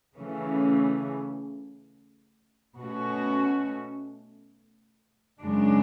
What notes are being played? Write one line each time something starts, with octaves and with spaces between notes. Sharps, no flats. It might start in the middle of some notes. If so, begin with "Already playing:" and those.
C#3 E3 A3 C#4
B2 A3 C#4 F#4
F#2 C#3 G#3 D4